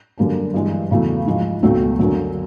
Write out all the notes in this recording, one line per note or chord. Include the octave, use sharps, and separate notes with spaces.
F#2 D3 G3 A#3 D4
G2 E3 G#3
E2 C#3 F#3 A3
G#2 F3 G#3
C#2 B2 F#3 A3 C4
F#2 D3 F#3